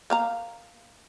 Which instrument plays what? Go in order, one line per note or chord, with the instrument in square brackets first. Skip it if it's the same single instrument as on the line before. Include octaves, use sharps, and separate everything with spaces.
[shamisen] A#3 F5 A#5